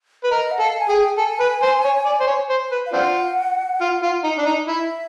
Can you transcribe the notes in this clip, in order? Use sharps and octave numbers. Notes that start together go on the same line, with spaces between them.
B4
A#4 D#5
F#5
A4 F5
G#5
G#4 G5
A4 G#5
B4
C5
C#5
D5
C5
C#5
C5
B4
F5
C4 D4 F4 F#5
F4
F4
D#4
D4
D#4
E4 E5